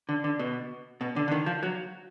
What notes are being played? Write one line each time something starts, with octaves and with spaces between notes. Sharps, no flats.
D3
D3
B2
B2
D3
D3
D#3
F3
F#3